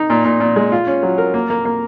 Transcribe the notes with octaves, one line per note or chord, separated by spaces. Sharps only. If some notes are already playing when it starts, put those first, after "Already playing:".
Already playing: D#4
A#2
A#2
A#2
G#3
F4
C#4
F#3
A#4
A#3
A#3
A#3